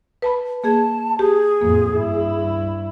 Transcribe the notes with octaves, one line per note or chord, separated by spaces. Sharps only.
B4 A5 B5
A#3 G#4 A5 G#6
G4 G#4
F2 A2 A#3
G2 E4